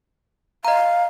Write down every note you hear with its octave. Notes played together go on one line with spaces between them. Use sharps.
D#5 F5 A#5